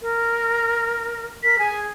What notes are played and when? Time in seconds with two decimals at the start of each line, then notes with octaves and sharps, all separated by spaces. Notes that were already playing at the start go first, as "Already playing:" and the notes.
0.01 A#4
1.43 A#4 B6
1.59 G#4 G#5